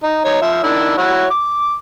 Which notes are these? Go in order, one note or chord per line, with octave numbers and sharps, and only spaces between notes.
D#4
D#4 C#5
F3 E5
D#3 D4 E4
E4 F#4 C#5
D6